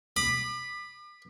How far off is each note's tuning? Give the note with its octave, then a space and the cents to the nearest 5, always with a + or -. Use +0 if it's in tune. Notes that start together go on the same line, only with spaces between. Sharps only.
B5 +0 D6 +40